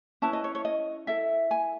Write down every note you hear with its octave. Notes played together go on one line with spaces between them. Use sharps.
C#4 E4 B4 A5
D#5
C#5
C#5
D#5
E4 A4 E5
G#5